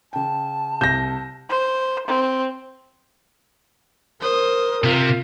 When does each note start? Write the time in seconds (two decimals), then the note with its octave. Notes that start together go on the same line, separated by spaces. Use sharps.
0.13 C#3 G5 A5
0.81 C2 G6 A#6 E7
1.49 C5
2.07 C4
4.21 A#4 C5 D#6
4.84 C3 F4